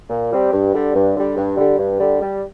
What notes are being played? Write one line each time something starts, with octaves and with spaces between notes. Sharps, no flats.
A#2
G3 C4 G4 D5
G2
D3 G3
G2
D3 G3
G2
D3 G3
G2
D3 G3
G3